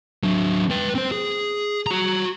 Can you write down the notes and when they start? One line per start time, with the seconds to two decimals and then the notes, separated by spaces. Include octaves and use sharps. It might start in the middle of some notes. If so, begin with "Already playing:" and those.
0.23 F#3 D4
0.71 B4 G5
0.95 C4 C5
1.12 G#4
1.87 F#4 A#5